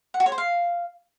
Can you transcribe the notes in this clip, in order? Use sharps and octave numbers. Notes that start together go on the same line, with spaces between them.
F#5
F#4
C#5
C5
F5